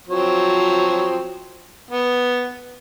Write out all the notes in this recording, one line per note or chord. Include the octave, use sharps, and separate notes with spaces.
F3 F#3 C4
B3